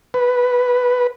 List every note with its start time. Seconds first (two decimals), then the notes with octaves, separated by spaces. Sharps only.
0.14 B4